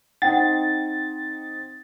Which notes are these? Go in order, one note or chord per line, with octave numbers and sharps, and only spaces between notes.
C4 D#4 F#5 G5 A6